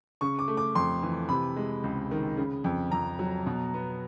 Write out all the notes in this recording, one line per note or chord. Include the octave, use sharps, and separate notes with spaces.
C#3 C#6
D6
A3
D6
F2 C6
E3
C3 B5
G#3
C#2
D#3
C#3
F2
F2 A#5
F#3
B2
B3